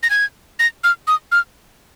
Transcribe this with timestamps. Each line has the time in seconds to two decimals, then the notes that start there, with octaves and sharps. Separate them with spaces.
0.03 A#6
0.10 G#6
0.59 A#6
0.84 F6
1.07 D#6
1.32 F6